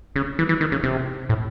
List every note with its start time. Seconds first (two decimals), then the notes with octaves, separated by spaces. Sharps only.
0.16 C#3
0.39 E3
0.49 E3
0.61 D#3
0.72 C#3
0.83 C3
1.29 A2